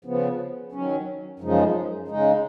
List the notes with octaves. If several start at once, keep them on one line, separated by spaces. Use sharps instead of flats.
C#3 F3 B3
D#3 F#3 C#4
F#2 C#3 F3 G#3 D#4
C#3 G#3 D#4